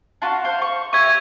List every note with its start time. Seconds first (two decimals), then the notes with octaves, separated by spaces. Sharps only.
0.22 D4 F4 F#4
0.44 C5 F5
0.62 C#6
0.93 C#4 G4 E5 C#6 G#6